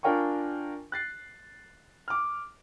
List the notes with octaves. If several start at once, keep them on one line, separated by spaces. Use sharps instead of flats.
D4 F4 A#4 G5 G#5 C#6
F#6 A6 C7
D6 F6